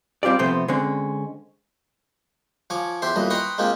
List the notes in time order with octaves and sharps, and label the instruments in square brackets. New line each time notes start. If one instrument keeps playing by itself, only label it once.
[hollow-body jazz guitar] G3 C4 F4 G4 D5
C3 F3 A3 B3 C4 C5
D3 G#3 C4 C#4
[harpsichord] F3 C#5 G#5 D6
E2 G4 C5 E5 C6
B1 G2 A#2 E3 D#5
B4 G5 A#5 C6 C#6 D#6
G#3 A#3 C4 D#4 F4 G4